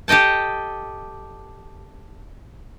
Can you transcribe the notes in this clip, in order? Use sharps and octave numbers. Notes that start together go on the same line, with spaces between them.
G4 A4 D#5 G5 A5